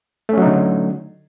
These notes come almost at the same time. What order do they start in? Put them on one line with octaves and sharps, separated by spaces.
A3 C#4 F#3 D#4 D3